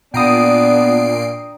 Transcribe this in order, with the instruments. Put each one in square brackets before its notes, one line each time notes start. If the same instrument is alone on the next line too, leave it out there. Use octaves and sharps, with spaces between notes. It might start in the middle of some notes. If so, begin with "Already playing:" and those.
[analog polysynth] A#2 C7 D7 [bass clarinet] B3 [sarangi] D4 [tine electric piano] G5 A#5 D#6